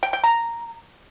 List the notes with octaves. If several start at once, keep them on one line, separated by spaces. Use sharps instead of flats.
G5
G5
A#5